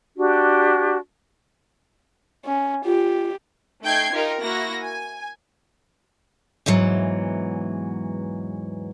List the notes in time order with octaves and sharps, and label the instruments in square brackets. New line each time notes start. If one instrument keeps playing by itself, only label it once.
[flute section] D4 F#4 G4
[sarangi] C#4
[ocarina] F4 [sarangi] G4
[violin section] A3 D#4 G5 G6 G#6 C7
D#4 F4 G4 A#4
A#3 E4 F#4 A#6
G#5
[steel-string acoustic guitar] E2 G#2 E3 F#3